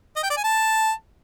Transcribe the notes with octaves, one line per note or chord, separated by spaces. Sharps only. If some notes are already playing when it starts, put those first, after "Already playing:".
D#5
G5
D5
G#5
A5